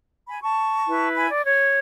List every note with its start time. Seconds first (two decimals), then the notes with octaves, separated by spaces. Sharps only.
0.28 G#5 B5
0.43 A5 C#6
0.87 E4 B4
1.16 G#5 B5
1.30 D5
1.45 C#5